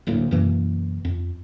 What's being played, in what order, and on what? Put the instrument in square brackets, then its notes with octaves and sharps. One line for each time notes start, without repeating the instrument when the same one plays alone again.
[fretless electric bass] D1 D2 A2 A#3
F#2 B2 E3 A#3
F2